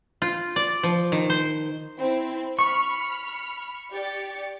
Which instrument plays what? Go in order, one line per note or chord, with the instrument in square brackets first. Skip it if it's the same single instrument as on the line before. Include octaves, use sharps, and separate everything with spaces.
[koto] F4
D5
F3
D#3
C5
[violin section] C4 E4 C5
[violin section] B5 F6 [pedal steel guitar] C#6
[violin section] G4 D5 A6